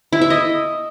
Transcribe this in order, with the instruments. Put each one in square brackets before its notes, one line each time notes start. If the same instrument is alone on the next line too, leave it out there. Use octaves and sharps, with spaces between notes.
[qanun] E4
E5
D#5